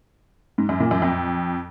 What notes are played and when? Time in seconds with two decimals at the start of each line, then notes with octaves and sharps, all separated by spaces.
0.58 G#2
0.69 F#2
0.80 A#2
0.91 F#2
1.02 F2